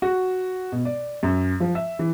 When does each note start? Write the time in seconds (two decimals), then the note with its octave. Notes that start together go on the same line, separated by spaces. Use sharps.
0.02 F#4
0.72 B2
0.85 D5
1.23 F#2
1.60 F3
1.75 E5
1.99 E3